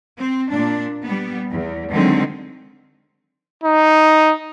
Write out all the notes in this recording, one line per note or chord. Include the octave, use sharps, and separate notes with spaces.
C4
A#2 D4
G3 B3
E2
D3 D#3 F#3 G#3 C4
D#4